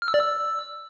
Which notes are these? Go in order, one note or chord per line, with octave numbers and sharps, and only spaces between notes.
F6
E6
D5
E6